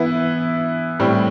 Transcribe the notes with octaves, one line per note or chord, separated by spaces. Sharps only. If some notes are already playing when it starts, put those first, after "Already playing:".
Already playing: E3 B3 E4
A2 G3 C4